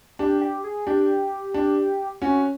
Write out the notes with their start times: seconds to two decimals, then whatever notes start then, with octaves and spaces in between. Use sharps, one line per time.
0.19 D4 G4
0.41 G4
0.64 G#4
0.87 D4 G4
1.54 D4
2.22 C#4 F#4